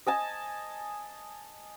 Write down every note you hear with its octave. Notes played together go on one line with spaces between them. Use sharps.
D#5 G#5 A5